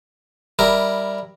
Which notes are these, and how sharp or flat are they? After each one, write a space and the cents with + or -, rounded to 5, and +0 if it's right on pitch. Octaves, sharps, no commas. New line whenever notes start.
G3 +0 E4 +0 A#4 +0